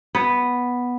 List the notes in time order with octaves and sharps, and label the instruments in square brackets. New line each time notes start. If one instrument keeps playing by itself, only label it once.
[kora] B3